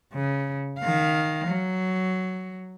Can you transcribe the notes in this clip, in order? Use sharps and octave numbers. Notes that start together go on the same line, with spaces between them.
C#3
D#3 F5
F#3